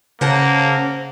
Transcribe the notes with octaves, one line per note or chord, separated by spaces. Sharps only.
C#3 A#3 C5 F#5 A5